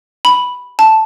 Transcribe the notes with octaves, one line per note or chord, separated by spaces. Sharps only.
B5
A5